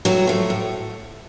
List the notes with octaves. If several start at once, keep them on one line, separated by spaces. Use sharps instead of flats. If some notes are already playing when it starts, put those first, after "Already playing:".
A2 F#3 F#4
F3 A3
A2